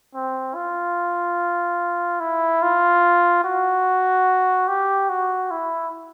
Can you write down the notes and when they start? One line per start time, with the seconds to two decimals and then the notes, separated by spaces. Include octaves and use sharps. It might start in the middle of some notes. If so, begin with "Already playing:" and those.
0.14 C4
0.55 F4
2.20 E4
2.62 F4
3.44 F#4
4.68 G4
5.09 F#4
5.51 E4